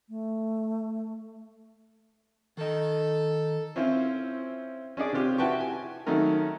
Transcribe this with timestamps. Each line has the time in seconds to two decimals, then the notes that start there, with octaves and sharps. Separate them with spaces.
0.09 A3
2.57 D#3 A4 D#5
3.76 C4 C#4 E4 F4 C5
4.97 C#4 D4 G#4 D5
5.13 C3 C#4 F4 G4
5.38 E4 F#4 B4 G5 A5 C#6
5.60 G#5
6.06 D#3 F#3 A3 C#4 D#4 A#4